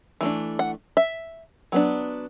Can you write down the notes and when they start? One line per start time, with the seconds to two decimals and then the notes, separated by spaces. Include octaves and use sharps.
0.21 E3 A3 D4
0.59 F#5
0.97 E5
1.72 F#3 B3 D4